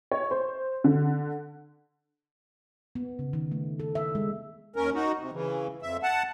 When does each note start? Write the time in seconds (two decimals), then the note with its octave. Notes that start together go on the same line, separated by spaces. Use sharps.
0.12 C#5
0.31 C5
0.84 D3
2.95 B3
3.19 C#3
3.33 D#3
3.51 A3
3.80 A4
3.95 E5
4.15 G#3
4.76 D#2 C#4 A#4
4.94 D#4 F#4
5.19 C3
5.32 C#3 E3
5.82 F2 E5
6.03 F#5 A5